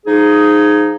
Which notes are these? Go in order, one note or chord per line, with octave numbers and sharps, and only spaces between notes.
F3 D#4 G#4